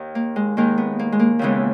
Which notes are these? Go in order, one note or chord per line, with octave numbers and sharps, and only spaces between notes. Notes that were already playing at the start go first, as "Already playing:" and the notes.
Already playing: D#2 D#3
A#3
G#3
D#2 D#3 G#3 A#3
B3
A#3
G#3
A#3
D#2 C#3 E3 G#3 B3